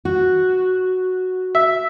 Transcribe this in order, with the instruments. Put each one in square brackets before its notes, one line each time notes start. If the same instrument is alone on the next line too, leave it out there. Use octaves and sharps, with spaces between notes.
[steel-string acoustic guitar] F#4
[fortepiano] E5